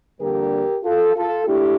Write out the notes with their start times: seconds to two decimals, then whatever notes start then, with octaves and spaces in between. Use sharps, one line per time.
0.20 F2 D3 G3 A#3 D4 G4 A#4
0.84 F4 A4
1.16 F4 A4
1.47 A3 D4 E4 G4